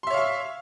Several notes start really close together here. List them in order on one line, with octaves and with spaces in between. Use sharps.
C6 E5 C#5 F5 C#6